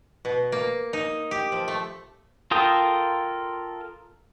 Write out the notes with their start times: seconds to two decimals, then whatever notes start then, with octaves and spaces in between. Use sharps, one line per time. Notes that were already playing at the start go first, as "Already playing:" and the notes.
0.25 B2
0.52 A#3
0.93 D#4
1.31 G4
1.52 F3
1.68 A3
2.51 F4 A4 A#4 G5 D#6